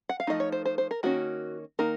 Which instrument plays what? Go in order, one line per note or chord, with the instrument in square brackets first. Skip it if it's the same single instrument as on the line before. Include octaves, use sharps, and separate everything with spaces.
[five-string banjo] F#5
F5
F3 A3 D#4 D#5
C#5
C5
C5
C5
A#4
D#3 A#3 C#4 F#4
D#3 A#3 D#4 A#4